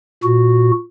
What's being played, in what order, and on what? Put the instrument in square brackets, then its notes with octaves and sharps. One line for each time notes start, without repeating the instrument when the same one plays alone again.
[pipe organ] A#2 F#4